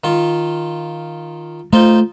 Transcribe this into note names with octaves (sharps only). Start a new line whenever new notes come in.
D#3 F4
A3 D#4 F4 C5